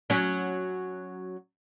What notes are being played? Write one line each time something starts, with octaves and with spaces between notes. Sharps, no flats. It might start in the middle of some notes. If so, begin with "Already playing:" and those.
F#3 C#4